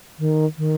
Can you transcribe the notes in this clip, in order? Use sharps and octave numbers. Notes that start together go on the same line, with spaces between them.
D#3
D#3